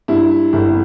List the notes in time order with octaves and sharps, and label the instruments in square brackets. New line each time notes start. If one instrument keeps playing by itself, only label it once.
[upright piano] G2 E4
G1 E4